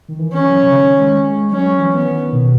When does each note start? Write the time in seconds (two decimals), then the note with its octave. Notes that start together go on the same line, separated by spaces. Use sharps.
0.08 D#3
0.19 E3
0.33 C#4
0.46 F#3
0.63 C#3
0.72 D#3
0.99 G#3
1.26 G#3
1.52 F#3 C#4
1.79 E3
1.93 B3
2.06 D#3
2.32 B2